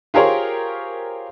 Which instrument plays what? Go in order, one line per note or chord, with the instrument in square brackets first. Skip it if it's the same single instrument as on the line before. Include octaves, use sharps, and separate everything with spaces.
[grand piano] F4 G4 G#4 A#4 C5 C#5